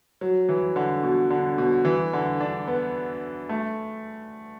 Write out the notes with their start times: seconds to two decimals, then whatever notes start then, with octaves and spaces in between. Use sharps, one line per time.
0.21 F#3
0.49 E3
0.76 D3
1.03 B2
1.30 D3
1.58 B2
1.85 E3
2.13 D3
2.40 D4
2.67 B3
3.49 A3